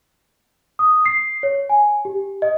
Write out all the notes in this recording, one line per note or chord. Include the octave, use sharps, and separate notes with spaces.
D#6
C7
C#5
G#5
G4
D#5